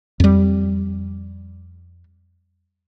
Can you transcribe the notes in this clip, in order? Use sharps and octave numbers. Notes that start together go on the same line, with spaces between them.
F2 G3